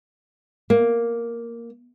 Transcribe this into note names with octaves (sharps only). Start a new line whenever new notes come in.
A#3